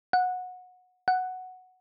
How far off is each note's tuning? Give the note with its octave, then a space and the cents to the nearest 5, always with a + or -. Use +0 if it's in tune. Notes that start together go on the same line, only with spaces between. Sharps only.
F#5 -20
F#5 +0